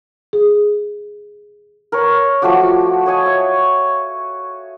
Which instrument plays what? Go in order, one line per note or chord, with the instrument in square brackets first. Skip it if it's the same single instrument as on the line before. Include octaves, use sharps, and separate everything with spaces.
[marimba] G#4
[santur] A#4 B4 C#5
F3 A3 F#4 D6
C#5 D#5 G#5
E5